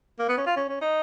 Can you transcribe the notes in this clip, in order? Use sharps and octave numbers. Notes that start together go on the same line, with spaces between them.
A#3
B3
C#4
F4
C#4
C#4
D#4